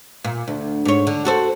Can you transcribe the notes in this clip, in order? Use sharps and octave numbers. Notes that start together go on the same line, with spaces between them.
A#2
D2
G#2 C#5
D3
F#4 A4 C5